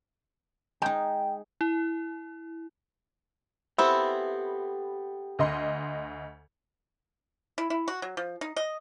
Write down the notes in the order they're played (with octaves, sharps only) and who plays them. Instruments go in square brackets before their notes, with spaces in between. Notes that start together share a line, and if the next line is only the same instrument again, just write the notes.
[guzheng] G#3 D#4 [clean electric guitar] G5
[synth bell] E4
[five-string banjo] B3 C4 [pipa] E4 [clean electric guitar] G4 A4
[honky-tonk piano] D2 D#5 C6
[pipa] E4
E4
F#4
F#3
F3
D#4
D#5